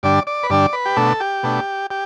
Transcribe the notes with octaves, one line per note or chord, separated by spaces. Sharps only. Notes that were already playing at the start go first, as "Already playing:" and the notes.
G2 D3 G3 D4 D5
D5
B4
G2 D3 G3 D4 D5
B4
G4
B2 A3 D4 A4
G4
B2 A3 D4
G4